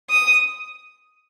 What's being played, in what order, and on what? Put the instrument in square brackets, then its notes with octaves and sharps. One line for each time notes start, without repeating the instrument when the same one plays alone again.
[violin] D#6